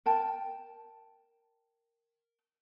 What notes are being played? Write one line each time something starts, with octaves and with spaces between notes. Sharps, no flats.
A#4 G5 A5